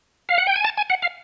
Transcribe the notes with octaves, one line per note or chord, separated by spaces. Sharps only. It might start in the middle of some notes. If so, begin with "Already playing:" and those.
F5
F#5
G5
G#5
A5
G#5
F#5
F5